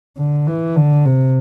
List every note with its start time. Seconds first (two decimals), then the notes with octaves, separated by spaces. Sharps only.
0.18 D3
0.47 E3
0.76 D3
1.05 C3